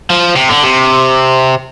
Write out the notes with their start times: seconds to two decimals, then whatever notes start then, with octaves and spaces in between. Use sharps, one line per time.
0.10 F3
0.36 C3
0.49 D3
0.63 C3